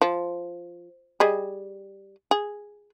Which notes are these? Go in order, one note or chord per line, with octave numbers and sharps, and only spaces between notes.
F3
G3 G#4 D#5
G#4